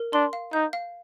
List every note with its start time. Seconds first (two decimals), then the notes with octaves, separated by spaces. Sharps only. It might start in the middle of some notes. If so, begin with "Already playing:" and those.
Already playing: A#4
0.13 D4 C6
0.33 F5
0.53 D#4 G6
0.73 F5